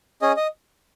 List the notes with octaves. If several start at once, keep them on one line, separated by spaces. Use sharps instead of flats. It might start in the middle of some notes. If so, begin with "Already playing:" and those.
C#4 G#4 D#5
D#5